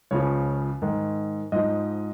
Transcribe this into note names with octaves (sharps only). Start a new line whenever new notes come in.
C#2 C#3 F3 C#5
G#2 D#3
G#2 F3 D#5